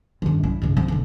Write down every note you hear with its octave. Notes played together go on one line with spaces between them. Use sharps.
G2 D#3
F#3 E4
F2 C#3
F3 C4
E1 D2